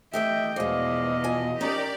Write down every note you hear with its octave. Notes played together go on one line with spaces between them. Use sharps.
E3 A3 G4 D#5 E5 G5
E2 B2 F3 G#3 D5 D#5 F5
F3 G#5
F3 C4 C#4 D#4 G4 A#4 D5